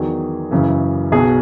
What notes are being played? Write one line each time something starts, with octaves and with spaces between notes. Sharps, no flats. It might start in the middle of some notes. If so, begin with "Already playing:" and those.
Already playing: E2 D#3 F#3 G#4
F#1 F#2 C#3 E3
B1 B2 F#3 G#4